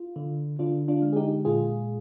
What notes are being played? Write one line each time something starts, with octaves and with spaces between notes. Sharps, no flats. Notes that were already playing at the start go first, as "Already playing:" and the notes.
Already playing: F4
D3
D3 D4 F4
D4 F4
G#3
G#4
D#4 G4
A#2 F4 G#4